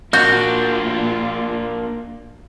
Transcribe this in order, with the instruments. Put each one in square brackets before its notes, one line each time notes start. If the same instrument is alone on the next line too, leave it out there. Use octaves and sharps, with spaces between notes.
[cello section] A#2 F4 [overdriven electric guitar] A#3 D4 [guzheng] F#4 [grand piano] G6